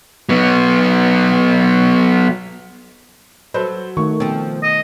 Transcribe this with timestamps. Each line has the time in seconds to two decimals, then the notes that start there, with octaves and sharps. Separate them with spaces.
0.29 F#3 B3
3.54 F#3 A4 B4 C5
3.97 D#3 A3 C#6
4.20 B2 F3 C4
4.63 D#5